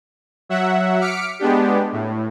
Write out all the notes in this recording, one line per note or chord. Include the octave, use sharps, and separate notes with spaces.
F#3 E5 F#5
D6 F6 B6 C#7 D7
G#3 B3 D4 G4
A2